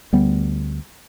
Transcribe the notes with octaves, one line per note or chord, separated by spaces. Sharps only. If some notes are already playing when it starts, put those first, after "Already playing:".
D2 G3 B3